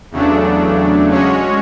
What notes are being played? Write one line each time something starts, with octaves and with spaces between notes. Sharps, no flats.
E2 C#3 F#3 A3 D4
G#3 C#4 F#4 C#5